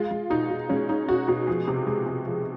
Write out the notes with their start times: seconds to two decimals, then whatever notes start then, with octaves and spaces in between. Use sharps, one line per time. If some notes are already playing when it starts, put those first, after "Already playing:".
Already playing: G#3 F4
0.11 G#3
0.30 B2 D#4
0.50 B2
0.69 G#3 C#4
0.89 G#3 D#4
1.08 B2 F#4
1.28 B2 F#4
1.47 F3 G#4
1.68 C3
1.87 G#3
2.06 C3
2.26 F3